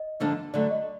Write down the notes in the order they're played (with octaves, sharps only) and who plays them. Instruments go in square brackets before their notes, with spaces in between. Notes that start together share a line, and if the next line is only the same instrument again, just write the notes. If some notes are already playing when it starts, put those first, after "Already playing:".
Already playing: [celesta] D#5
[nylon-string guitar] G2 D3 F3 A#3 D4
[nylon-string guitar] D3 F#3 A3 [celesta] D5
[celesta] D#5